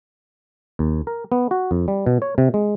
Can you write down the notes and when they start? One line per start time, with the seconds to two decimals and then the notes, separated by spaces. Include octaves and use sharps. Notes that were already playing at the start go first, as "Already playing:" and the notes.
0.79 D#2
1.07 A#4
1.32 B3
1.51 F#4
1.71 F2
1.88 G3
2.06 B2
2.22 C#5
2.38 C3
2.54 G#3